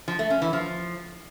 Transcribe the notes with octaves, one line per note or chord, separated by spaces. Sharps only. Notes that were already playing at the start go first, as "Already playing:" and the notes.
F3
A3
C#4
E3
F3